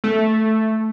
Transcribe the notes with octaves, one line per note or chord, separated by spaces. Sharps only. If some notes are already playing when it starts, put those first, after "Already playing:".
A3